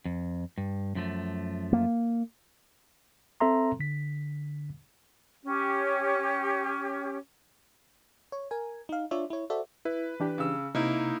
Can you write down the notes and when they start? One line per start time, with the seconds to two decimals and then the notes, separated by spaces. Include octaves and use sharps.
0.05 F2
0.58 G2
0.95 F#2 F3 A3
1.73 A#3
3.40 C4 A4 E5 A#5 C6
3.80 D3 B6
5.44 C#4 G4
8.32 C#5
8.51 A#4 G#5
8.89 D#4 F5
9.11 D4 F4 C#5 D5 E5
9.30 E4 C#5
9.50 F#4 A4 C5 D5 E5
9.85 E4 B4
10.20 E3 D4 G4
10.38 C#3 E6
10.75 C3 A#3 D#4 E4